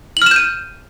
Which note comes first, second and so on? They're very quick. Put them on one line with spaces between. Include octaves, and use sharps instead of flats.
F#7 F6 E7 G6 D#7